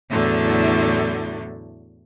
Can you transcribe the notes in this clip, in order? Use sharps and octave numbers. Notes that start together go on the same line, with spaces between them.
E2 A2 D3 F#3 A3